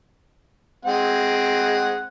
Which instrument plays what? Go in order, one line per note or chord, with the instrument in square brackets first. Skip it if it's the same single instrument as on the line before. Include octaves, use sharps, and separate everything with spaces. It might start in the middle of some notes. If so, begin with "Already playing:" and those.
[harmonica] G#3 C4 F#5